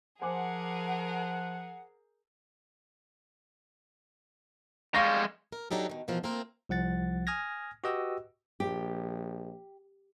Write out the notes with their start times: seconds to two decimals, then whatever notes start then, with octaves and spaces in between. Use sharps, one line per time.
0.22 F3 G#4 A#4 C5 F#5 G#5 D6
4.95 G3 G#3 F5 C#6 A#6
5.52 A#4
5.71 F#3 D4 D#4 G4 A4
5.90 B2 D#3
6.08 B2 E3 F3 A#4
6.23 A3 A#3 C4 F4 A#4
6.69 C2 F3 F#5 A6
7.27 G#5 D#6 F6 G#6 A#6
7.84 F#4 G4 B4 D#5 G5 E6
8.60 A#1 G4